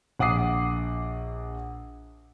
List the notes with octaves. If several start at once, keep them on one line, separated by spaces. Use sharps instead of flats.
A#1 F#5 D6 D#6 C7